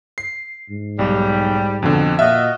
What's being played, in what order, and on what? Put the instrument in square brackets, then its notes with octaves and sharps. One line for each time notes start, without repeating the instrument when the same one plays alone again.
[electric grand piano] C7
[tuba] G#2
[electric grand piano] B1 [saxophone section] G3
[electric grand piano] F2 B2 D3
[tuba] A#2 [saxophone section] F4 F#4 D#5 [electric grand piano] E5